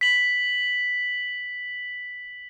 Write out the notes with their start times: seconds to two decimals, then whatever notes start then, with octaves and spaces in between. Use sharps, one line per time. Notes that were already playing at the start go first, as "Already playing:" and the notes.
0.01 B6 F#7